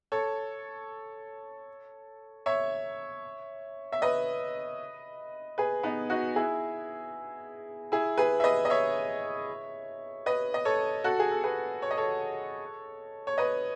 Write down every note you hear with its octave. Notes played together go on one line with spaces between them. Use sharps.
A4 C#5
C#5 E5
E5
B4 D#5
G#4 B4
B3 D#4
D#4 F#4
E4 G#4
E4 G#4
G#4 B4
E5
B4 D#5
D#5
C#5 E5
B4 D#5
D#5
A4 C#5
F#4 A4
G#4
A4
G#4 B4
C#5
D#5
A4 C#5
C#5
B4 D#5